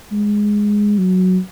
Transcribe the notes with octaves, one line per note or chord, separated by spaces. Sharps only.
G#3
F#3